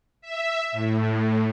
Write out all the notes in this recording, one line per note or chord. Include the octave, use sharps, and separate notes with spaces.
E5
A2